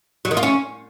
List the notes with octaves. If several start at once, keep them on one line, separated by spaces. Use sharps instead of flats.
F#3
D#3
F4
C#4